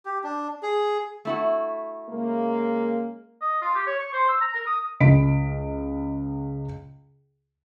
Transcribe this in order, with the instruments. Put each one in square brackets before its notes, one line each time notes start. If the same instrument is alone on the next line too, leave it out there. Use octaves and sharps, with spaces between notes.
[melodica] G4
D4
G#4
[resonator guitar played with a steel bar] A3 E4 F#4
[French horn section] C#3 G#3 A#3
[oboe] D#5
F4
G4
C#5
C#6
C5
E6
A#5
A#4
D#6
[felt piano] C#2 D#5 B5 B6 D7